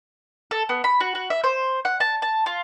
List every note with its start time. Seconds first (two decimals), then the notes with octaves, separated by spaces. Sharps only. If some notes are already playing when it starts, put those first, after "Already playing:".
0.51 A4
0.69 B3
0.84 B5
1.00 F#4
1.15 F#4
1.30 E5
1.44 C5
1.85 F#5
2.00 A5
2.22 A5
2.46 F4